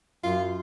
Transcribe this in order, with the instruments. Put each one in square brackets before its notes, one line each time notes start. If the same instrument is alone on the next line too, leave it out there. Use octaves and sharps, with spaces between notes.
[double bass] F#2 [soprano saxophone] F4